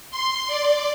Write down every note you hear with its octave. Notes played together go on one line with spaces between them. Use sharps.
C6
D5